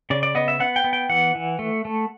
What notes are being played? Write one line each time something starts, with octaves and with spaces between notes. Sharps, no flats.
C#3 D5
D5
B3 D#5
E5
B3 F#5
G5
B3
G5
E3 F#5
E3
A3
A3